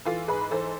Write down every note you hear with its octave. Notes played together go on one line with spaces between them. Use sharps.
E3 F4 A4
G#2 G#4 B4
E3 A4 C5